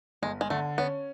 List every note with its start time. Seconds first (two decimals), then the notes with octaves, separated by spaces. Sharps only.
0.22 G1 G#3
0.41 G#3
0.50 D3 A3
0.78 B3 C#4